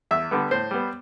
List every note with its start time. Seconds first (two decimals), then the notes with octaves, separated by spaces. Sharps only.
0.11 E2 E5
0.31 D3 G3 B3
0.51 A2 C5
0.71 G3 B3